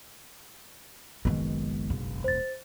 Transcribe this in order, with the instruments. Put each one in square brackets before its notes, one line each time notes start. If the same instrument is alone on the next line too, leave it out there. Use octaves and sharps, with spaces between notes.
[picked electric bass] F#1 B1 B2 [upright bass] D#3 G#3
[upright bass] E1
[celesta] C5 A6